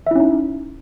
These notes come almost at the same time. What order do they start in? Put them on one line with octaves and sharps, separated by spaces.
E5 E4 C#4 D#4